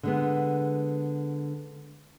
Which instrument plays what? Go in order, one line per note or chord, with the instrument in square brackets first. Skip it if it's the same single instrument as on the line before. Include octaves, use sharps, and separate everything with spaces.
[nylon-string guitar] D3 G#3 B3